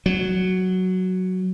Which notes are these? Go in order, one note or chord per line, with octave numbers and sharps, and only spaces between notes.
F#3